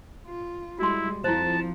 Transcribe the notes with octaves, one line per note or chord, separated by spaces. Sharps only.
F4
G3 G#3 E4 F#4 C6
F2 F3 E4 C5 A5